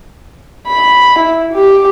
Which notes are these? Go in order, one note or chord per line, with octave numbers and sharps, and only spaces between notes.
B5
E4
G4